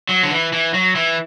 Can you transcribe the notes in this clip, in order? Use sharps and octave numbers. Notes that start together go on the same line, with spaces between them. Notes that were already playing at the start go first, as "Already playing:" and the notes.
F#3
D3
E3
E3
F#3
E3